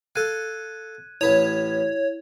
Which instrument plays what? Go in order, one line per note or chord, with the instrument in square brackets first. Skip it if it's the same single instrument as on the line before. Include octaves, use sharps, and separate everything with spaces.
[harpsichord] A4 F5 [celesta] F#6 G#6 D#7
[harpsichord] A1 B4 D#6 [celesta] E4 [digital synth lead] C#5